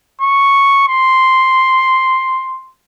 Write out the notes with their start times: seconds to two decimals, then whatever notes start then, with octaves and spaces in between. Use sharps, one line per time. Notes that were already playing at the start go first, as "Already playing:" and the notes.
0.21 C#6
0.88 C6